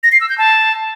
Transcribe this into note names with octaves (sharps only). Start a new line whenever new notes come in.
A#6
C7
E6
G6
A5